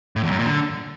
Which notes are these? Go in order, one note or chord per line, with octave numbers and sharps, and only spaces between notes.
A2
E2
F#2
A#2
D3